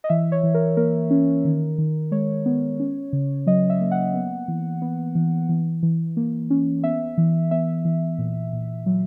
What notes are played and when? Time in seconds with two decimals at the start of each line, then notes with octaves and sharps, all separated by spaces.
0.04 D#5
0.09 E3 E5
0.32 C#5
0.43 E3
0.54 A#4
0.77 A#3 A#4
1.10 C#4
1.45 D#3
1.78 D#3
2.11 G#3 C#5
2.46 B3
2.80 C#4
3.13 C#3
3.47 F#3 D#5
3.70 E5
3.81 A#3
3.91 F#5
4.14 B3
4.48 E3
4.82 B3
5.15 E3
5.49 E3
5.83 E3
6.17 A#3
6.50 C#4
6.84 B3 E5
7.18 E3
7.51 B3 E5
7.85 E3
8.19 A#2
8.53 A#2
8.86 F#3